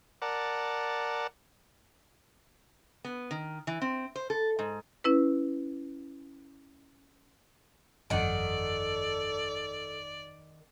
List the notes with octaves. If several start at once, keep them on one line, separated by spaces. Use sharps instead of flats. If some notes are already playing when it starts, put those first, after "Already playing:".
A#4 D5 F#5 A5
B3
D#3
E3
C4
C5
A4
G#2
C#4 E4 B4
G1 F2 D#3 A4 D5 F#5